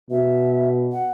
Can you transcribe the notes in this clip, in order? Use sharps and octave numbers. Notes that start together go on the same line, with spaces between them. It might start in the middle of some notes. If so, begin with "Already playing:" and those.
B2 E5
F#5